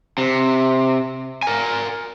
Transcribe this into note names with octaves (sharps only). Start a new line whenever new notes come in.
C3
A#4 G#5